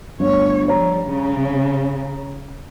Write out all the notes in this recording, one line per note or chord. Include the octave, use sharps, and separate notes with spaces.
G1 D2 C#5
F3 G3 C#5 A#5
C#3